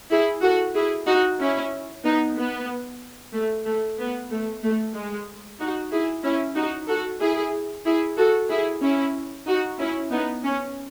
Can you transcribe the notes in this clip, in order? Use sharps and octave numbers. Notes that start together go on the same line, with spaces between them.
E4 G#4
F#4 A4
E4 G#4
D#4 F#4
C#4 E4
B3 D#4
B3
A3
A3
B3
A3
A3
G#3
D#4 F#4
E4 G#4
C#4 E4
D#4 F#4
F#4 A4
E4 G#4
E4 G#4
F#4 A4
E4 G#4
C#4 E4
D#4 F#4
C#4 E4
B3 D#4
C#4